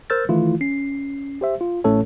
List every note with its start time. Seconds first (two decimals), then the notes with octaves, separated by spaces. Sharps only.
0.10 A#4 C5 E6 F6 G6 A6
0.29 D#3 E3 A3 E4 F4
0.61 C#4 C7
1.41 G4 C5 E5
1.61 F4
1.84 A1 A2 A3 C#4 A4 C#5